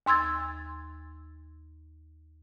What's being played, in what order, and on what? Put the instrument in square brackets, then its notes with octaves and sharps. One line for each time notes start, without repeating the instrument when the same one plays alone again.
[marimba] D#2 C6 E6 G#6 A6